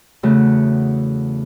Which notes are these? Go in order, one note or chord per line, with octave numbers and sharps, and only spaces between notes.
E2 C#3 A3 F#4